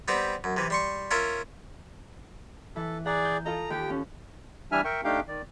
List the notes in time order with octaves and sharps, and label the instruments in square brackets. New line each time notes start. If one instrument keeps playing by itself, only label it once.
[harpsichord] G3 B3 C4 G4
F#2
C3 E3
G3 C6 C#6
C#4 F4 A#4 E5
[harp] E3 [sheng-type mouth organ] A4
[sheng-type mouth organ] G#4 D5 [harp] F#5 A#5
[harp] G6
[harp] F4 A4 D#5 [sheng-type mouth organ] A#5
[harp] D#2 G4 [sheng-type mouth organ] G5
[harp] C#4
[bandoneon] E3 G3 D4 E5 G#5 F6
A#4 E5 G5 C#6
A3 D4 D#4 G4 F5 G5
D#3 D5